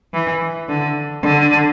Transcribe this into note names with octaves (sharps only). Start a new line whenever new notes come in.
E3
D3
D3